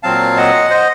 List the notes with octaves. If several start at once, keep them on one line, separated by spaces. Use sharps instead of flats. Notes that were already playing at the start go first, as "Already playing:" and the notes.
A#2 F#3 C4 F5 A5
D#5 F#5
C5 D#5